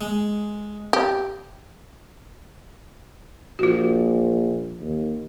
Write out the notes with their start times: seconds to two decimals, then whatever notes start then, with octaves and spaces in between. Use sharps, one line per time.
0.01 G#3
0.93 G4
3.59 A#1 F4 F#4
4.80 D#2